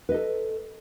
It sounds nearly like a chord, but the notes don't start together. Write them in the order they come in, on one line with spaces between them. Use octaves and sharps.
B4 D#5 A4